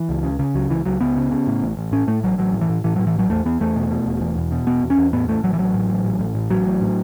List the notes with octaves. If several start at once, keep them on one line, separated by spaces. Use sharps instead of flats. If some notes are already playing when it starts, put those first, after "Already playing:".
Already playing: E3
C#2
C#3
C#3
C#2 F#3
C#2 E3
C#2 F#3
C#2 B3
C#3
C#3
A2
A1
A1
A2 C#4
A2 A3
A1 F#3
A1 F#3
A2
E3
A2
A2 E3
F#3
A2
E3
A1 F#3
E2 A3
E2 B3
E2 A3
B2
B2
E1
E2
E1
B2
E1 B3
E2
C#4
E2
A2 B3
A1 A3
A1 F#3
E3
A1 F#3
A2
A1
A1
A2
A1
A1 F#3
A2
A2